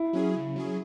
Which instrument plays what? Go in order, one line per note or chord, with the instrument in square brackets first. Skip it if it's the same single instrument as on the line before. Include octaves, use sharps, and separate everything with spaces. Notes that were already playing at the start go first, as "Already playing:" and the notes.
Already playing: [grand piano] E4
[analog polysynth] F#3 C#4 G#4
C#3
F#3 C#4 G#4